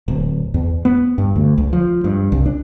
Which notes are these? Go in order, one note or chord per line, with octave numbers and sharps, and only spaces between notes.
D1
E2
B3
G2
D2
C#2
F3
G2
C2
D4